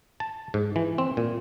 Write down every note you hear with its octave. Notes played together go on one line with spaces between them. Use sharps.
A5
G#2
E3
C4
A#2